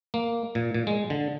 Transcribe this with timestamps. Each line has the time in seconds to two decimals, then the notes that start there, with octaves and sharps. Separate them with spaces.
0.14 A#3
0.55 A#2
0.74 A#2
0.87 G#3
1.10 D3